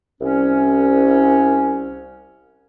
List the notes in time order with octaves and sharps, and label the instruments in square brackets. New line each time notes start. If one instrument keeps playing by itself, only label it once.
[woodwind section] C2 C#4